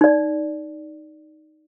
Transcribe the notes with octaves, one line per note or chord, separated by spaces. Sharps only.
D#4 D5